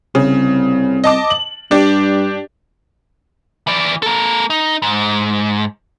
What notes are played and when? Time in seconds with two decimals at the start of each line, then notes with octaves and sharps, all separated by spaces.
0.15 C2 C#3
1.04 D#5 A5 D6
1.30 F#7
1.71 G2 D4 G4 D5
3.67 E3 D5
4.03 A#3 A4
4.50 D#4
4.82 G#2